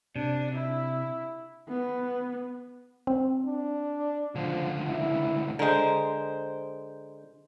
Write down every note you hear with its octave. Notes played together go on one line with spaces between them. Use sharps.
C3 D4
E4
B3
C4
D4
C#2 D3 F3
E4
D3 G#3 A#4 C5